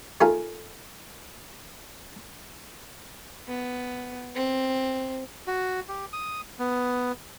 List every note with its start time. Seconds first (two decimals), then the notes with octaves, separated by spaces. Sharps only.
0.21 A3 D#4 F4 G#4 A#4
3.48 B3
4.35 C4
5.47 F#4
5.88 G4
6.13 D#6
6.59 B3